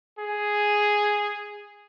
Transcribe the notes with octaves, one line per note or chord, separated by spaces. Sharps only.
G#4